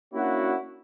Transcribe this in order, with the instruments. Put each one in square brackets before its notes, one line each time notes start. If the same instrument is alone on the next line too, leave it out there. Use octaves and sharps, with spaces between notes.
[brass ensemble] A#3 C#4 D4 E4 F#4